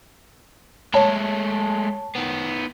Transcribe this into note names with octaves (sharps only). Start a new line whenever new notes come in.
G#3 A3 C#5 A5
D#3 B3